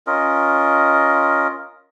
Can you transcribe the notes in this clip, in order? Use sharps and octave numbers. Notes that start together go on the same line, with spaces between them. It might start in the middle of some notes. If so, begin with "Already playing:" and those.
C#4 F4 A#4 D#5